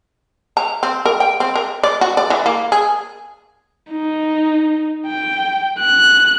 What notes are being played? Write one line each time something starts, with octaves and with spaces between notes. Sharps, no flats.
A#5
C4
A#4
G5
C4
A#4
D5
F#4
D5
E3
A#3
G#4
D#4
G5
F#6